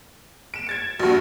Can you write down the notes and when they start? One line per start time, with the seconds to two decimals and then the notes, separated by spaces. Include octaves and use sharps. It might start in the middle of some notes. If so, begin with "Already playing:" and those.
0.54 D7 E7
0.67 G#6 A6 C#7
1.00 A#1 G2 F#4